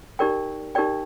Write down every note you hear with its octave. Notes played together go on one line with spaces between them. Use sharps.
D#4 G4 A#4 D5 G5
D#4 G4 A#4 D5 G5